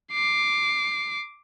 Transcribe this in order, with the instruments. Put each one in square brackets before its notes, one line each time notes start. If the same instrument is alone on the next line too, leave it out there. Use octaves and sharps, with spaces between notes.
[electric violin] D6 C7